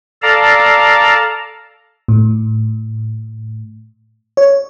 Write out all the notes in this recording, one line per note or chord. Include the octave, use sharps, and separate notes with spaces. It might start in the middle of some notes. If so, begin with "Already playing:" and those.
A4 D5 F5 A5 A#5
A2
C#5